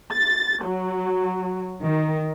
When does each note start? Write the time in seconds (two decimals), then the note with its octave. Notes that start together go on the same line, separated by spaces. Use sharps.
0.11 A6
0.63 F#3
1.83 D#3